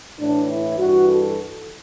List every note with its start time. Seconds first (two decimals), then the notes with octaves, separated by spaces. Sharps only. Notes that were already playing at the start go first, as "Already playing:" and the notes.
0.19 A2 E3 D4
0.49 E4
0.78 G2 E3 F#4
1.08 A4